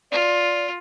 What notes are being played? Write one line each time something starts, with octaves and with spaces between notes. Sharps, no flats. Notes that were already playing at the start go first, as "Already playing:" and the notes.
F4 D5